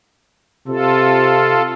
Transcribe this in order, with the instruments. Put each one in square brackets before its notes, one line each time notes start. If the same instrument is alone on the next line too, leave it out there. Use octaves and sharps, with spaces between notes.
[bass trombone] C3 [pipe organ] F4 A4